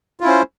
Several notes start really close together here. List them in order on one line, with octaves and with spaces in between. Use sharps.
F4 E4 C#4 C5